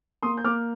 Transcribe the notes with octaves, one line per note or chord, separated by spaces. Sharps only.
A#3 C6 D#6
G6
A#3 D6 F6